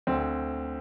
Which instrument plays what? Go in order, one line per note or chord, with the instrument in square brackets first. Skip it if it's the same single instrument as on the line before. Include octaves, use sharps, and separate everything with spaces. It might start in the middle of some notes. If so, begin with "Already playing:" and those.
[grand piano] D2 C4